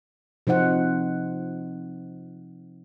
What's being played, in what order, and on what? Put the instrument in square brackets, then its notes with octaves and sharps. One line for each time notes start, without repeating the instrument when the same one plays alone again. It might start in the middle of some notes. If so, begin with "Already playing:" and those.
[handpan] C3 F3 D#4 C5 F#5